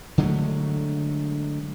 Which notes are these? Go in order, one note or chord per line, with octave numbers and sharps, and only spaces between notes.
D3 F#3 G#3 A3